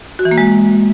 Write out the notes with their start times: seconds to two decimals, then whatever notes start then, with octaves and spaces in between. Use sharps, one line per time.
0.19 F#4
0.25 E3
0.31 A#3
0.38 G#3